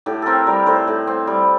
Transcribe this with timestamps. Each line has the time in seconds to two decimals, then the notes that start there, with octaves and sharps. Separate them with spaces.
0.06 A2 G4
0.22 C4 A4 A#4
0.47 G3 A#4
0.66 A2 C5
0.87 A2
1.07 C4
1.27 G3